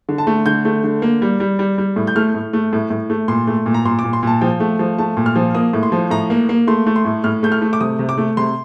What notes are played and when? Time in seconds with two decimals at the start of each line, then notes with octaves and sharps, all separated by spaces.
0.09 D3
0.18 A5
0.27 A3
0.46 D3 G6
0.65 A3
0.84 D3
1.02 A#3
1.22 G3
1.40 G3
1.59 G3
1.78 G3
1.96 A2
2.07 G6
2.16 A3 F6
2.34 A2
2.53 A3
2.73 A2
2.90 A2
3.10 A3
3.28 A#2 C6
3.47 A3
3.66 A#2
3.74 A#5
3.85 A#2 C6
3.99 D6
4.04 A#2
4.13 C6
4.23 A#2 A5
4.41 F3 G5
4.60 A3
4.79 F3
4.98 A3 A5
5.17 A#2
5.26 F6
5.36 F3
5.55 A#3 D#6
5.73 A2
5.83 C6
5.92 F3
6.11 A2 A#5
6.30 A#3
6.49 A#3
6.67 A3 C6
6.86 A3
6.96 C6
7.05 A2
7.24 A2 F6
7.43 A3 G6
7.52 F6
7.62 A3
7.73 D6
7.81 C3 D#6
7.99 C3
8.09 D6
8.18 A3
8.37 C3 C6